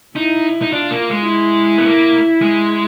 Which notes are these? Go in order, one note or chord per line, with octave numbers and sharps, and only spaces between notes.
D#4 E4
D#4
D4 F4
A#3
G#3
E4
B3
A#3
G#3